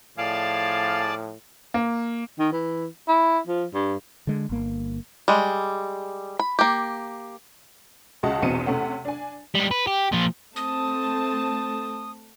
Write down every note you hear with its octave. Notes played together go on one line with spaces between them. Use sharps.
A2 F3 G#4 D5 F5 A5
A#3
D#3
E3
E4
F3
G2
D3 G#3
G1 A#3
G3 G#3
B5
A#3 G4
C#2 C#3 F#4 D#5 F#5 A5
A#1 E2 B2 C4 C#7 D#7
C3 A3 C#4 F#5
D4 G#5
G3 G#3
B4
G4
A#2 F3
A3 C4 A5 D#6